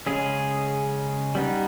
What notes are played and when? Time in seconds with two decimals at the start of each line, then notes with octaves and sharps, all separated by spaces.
0.06 C#3 G#3 C#4 G#4
1.35 G3 B3 D#4